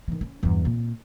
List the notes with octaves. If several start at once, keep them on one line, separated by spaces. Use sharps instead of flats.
D#3 E3
C#4
E2 G2
A#2 C4